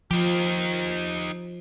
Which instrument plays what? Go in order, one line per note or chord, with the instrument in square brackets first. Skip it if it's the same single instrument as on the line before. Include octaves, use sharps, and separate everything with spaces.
[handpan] F3 [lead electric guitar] D#4 G4